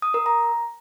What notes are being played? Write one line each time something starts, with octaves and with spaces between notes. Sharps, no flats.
D#6
A#4
A#5